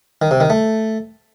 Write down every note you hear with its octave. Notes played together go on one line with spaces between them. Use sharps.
D#3
C3
D#3
A3